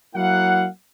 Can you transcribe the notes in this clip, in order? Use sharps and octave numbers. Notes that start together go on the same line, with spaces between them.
F#3 A#3 E4 F5 F#5